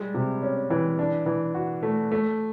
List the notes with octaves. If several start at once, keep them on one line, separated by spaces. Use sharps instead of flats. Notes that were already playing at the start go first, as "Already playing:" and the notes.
Already playing: G3 G#3
C3
C#4
E3
D4
E3
F#4
A3
A3